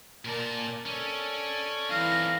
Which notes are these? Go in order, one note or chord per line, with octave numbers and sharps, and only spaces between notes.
A#2 A#4 D5 A5
C#4 A4 D5
E3 C4 D#4 F5 A#6